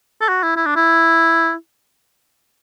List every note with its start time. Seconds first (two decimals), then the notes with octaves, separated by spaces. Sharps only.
0.21 A4
0.29 F#4
0.43 E4
0.57 E4
0.66 D4
0.76 E4